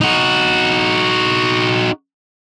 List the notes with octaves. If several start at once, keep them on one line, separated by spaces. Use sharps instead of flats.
D#4 F#4